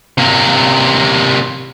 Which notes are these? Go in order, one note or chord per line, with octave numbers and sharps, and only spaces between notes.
C3 A#3